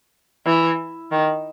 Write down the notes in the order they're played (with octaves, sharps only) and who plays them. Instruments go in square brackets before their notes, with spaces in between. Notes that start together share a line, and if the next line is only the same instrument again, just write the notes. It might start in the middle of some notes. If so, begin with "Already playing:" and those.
[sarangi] E3
D#3